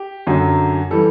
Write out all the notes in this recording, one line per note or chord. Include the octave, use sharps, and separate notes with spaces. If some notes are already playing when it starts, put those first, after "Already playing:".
Already playing: G4
F#2 D3 F#3
E3 G3 A4